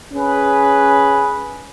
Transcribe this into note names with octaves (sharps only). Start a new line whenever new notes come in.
C#4 G#4 B4